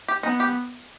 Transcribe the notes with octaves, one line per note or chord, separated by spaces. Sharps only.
G4
B3 D#4
G4